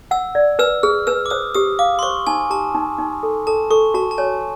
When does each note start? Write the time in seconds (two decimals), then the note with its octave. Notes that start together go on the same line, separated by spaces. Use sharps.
0.11 F#5 E6
0.35 D5
0.59 B4 E6
0.83 G#4 F6
1.07 B4 E6
1.26 D6
1.30 C5 D#6
1.55 G4 D#6
1.79 F5 D6
1.99 C6
2.03 C5 C#6
2.27 D#4 G#5
2.50 G4 A5
2.75 D#4
2.98 D#4
3.23 A4
3.47 A4 A5
3.70 A4 C#6
3.94 F#4 A5
4.11 A5
4.18 C#5 G#5